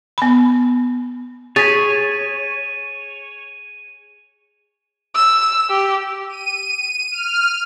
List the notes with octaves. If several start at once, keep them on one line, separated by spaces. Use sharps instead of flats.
B3 B5
G#4 C#5 A6 B6 D#7
E6
G4
D#7
F6